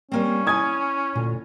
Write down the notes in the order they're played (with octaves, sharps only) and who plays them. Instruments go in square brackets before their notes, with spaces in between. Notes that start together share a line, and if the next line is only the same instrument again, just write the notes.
[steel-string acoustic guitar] G3 A#3 C4 [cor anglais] C#4
[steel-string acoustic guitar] E4 G#5 [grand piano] D#6 G#6
[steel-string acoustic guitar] D2 [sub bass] A#2